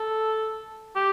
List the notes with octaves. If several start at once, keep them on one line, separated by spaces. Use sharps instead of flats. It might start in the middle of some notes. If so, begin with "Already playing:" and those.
Already playing: A4
G4